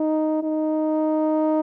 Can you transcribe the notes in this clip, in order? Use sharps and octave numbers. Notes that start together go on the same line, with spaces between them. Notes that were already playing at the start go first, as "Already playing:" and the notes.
Already playing: D#4
D#4